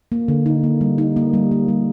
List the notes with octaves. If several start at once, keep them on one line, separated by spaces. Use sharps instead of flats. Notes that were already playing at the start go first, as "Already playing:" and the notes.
A#3
D3
D#4
A#3
G3
D#4
A#3
G3
A#3
G3